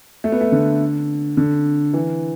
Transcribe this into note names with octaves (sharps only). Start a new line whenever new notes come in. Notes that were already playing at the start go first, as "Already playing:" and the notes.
A3
B3
A3
D3
D3
E3